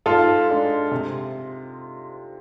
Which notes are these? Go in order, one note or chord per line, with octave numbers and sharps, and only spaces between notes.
G#2 F4 A4
G#3 D4
C3